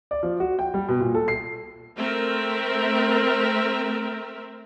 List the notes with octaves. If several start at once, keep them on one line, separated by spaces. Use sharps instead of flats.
D5
F3
F#4
G5
G3
B2
A#2
A4
C7
A3 C4 A#4 E5